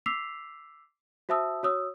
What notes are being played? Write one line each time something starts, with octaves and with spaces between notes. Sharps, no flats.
D6 E6 B6 C7 F7
F#4 C5 E5 A5 D#6 E6
F#4 C#5 D#6 E6